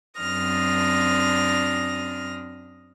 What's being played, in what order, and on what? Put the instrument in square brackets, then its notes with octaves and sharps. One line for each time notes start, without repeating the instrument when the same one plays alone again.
[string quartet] F#2 C4 D4 D#6 F6 A#6